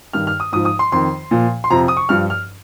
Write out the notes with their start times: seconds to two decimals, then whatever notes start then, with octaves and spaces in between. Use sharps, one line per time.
0.13 G2 D#3 F6
0.27 F6
0.40 D#6
0.52 G#2 F3 D#6
0.65 D#6
0.79 C6
0.92 F2 D#3 C6
1.31 A#2 F3
1.64 C6
1.70 F2 C3 F3 A#5
1.88 D#6
1.97 C#6
2.09 G2 F3 F6
2.30 F6